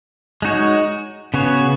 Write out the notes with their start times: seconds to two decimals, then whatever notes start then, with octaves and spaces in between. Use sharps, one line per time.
0.42 G#3 D#4 F#4 C#5
1.34 C#3 B3 F#4 C#5